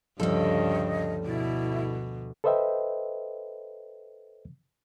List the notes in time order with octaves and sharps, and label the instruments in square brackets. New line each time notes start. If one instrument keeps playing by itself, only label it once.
[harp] D2 F3 F6 [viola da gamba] G2 C#3 [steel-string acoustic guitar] G3 A4 [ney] D#5
[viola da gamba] B2 [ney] E4 [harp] D6 A6
[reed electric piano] A4 B4 C5 D#5 E5 G5